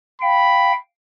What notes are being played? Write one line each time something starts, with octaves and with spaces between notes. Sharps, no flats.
F5 G5 B5